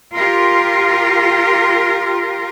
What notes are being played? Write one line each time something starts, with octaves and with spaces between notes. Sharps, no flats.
F4 G4 A#4